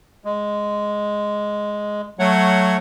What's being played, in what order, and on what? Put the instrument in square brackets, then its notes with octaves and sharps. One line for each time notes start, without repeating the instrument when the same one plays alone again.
[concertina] G#3
[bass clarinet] F#3 [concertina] A3 C#5 F#5